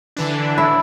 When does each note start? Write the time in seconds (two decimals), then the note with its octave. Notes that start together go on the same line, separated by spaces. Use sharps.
0.17 D3 E3 D4
0.58 E4